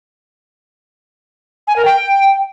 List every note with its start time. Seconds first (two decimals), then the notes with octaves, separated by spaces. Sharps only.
1.67 G#5
1.76 A#4
1.85 G5